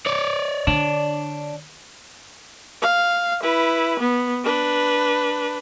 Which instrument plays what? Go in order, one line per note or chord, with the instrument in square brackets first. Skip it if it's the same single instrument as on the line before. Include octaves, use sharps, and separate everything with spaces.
[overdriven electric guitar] C#5 D5
[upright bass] D3 [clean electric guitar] D4
[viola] F5
E4 B4
B3
D4 B4